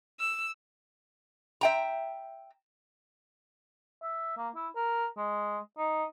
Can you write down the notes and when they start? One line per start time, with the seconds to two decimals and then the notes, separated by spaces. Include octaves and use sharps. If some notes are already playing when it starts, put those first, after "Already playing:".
0.20 E6
1.61 E5 G5 A#5
4.02 E5
4.37 A#3
4.55 E4
4.76 A#4
5.17 G#3
5.78 D#4